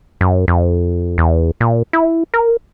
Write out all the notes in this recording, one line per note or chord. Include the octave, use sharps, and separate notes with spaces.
F#2
F2
E2
A#2
E4
A#4